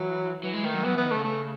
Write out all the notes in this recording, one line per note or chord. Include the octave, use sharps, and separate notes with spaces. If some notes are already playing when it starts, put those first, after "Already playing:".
Already playing: E3 F#3
E3 F#3
G#3
D#3 A3
F#3
F#3 B3
E3 B3
D#3
C#3 A3
A3